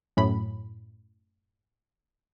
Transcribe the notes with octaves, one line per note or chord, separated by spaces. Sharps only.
F#2 A2 B5